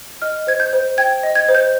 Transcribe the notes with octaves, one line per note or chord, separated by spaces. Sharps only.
D#5 F6
C5 G#6
G6
C5
G5 G#6
D#5
G#6
C5
G6